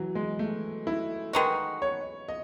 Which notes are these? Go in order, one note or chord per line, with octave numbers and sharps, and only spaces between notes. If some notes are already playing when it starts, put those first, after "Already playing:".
Already playing: E3 F#3
G#3
A3
E4
D#3 G#3 D#4 F#4 B4
C#5
D#5